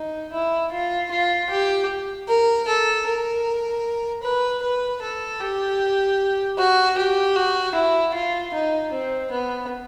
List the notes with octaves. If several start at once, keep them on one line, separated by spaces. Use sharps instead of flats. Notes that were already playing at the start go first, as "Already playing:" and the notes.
Already playing: D#4
E4
F4
F4
G4
A#4
A4
A#4
B4
B4
A4
G4
F#4
G4
F#4
E4
F4
D#4
C4
B3